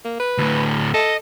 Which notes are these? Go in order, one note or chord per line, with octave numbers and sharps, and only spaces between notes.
A#3
B4
D2 A2
A4 D#5